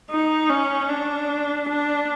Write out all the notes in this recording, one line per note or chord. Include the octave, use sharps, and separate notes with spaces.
D#4
C#4
D4
D4